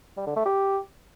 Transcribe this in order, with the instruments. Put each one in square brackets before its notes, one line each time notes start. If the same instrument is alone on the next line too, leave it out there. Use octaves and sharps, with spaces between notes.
[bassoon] G3
D3
A3
G4